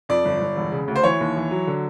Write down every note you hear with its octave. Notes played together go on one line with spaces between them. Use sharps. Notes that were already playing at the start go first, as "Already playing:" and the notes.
F2 D5
G1
G1
E1
C#3
D2
C5
E3 C#5
D#2
E3
F#3
D3